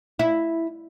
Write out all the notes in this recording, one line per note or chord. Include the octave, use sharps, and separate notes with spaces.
E4